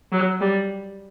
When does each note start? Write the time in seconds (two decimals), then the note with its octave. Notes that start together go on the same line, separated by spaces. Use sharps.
0.12 F#3
0.41 G3